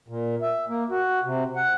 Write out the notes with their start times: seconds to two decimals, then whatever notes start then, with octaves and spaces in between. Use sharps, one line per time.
0.08 A#2
0.42 E5
0.69 A#3
0.90 F#4
1.24 C3
1.56 F#5